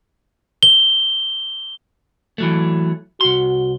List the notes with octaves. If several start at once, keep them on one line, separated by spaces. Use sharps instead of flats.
G7
E3 F#3 A3
C2 F#4 C6